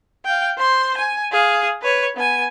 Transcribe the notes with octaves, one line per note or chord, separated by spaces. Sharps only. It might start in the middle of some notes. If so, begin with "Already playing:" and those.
F5 G5
C5 C6
G#5
G#4 F5
B4 C#5
B3 G#5